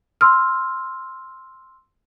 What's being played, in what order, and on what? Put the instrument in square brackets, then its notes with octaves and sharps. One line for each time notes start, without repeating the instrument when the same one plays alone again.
[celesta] C6 E6 F6